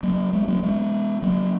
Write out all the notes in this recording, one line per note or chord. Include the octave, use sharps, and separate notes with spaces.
F#3 A#3
G#3 B3
F#3 A#3
G#3 B3
F#3 A#3